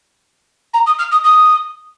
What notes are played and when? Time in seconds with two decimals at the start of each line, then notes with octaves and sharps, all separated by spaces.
0.73 A#5
0.86 D#6
0.98 F6
1.11 D#6
1.24 D#6